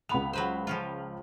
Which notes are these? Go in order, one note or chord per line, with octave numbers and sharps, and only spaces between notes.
C#2 B3 B5 F7
F#3 B4 C5
F3 C#4 F4